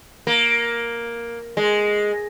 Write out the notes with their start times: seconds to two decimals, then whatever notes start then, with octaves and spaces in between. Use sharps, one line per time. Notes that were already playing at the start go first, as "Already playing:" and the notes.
0.27 A#3
1.57 G#3